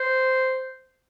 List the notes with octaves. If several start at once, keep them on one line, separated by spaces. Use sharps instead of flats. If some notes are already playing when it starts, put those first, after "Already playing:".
Already playing: C5